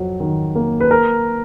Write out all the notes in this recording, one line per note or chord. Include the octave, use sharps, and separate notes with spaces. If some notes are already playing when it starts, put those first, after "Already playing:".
Already playing: F2 F#3
D#3
A#3
B4
A#4